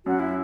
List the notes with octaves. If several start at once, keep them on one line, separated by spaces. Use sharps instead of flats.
F#2 F#4
E4